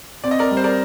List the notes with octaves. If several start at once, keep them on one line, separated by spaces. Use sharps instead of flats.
C4 D5
D#5
A#4 D5
G3
C5
A#4 D5